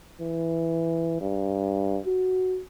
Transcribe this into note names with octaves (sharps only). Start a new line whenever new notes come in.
E3
G2
F#4